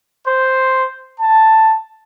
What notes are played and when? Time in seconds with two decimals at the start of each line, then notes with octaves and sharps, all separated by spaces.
0.25 C5
1.19 A5